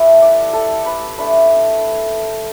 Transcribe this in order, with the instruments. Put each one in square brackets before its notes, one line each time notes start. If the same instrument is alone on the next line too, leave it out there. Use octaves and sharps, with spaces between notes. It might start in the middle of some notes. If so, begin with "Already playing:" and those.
Already playing: [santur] A3 E4 G4 A4 B4 E5
D5
A4
B4
A3 D4 B4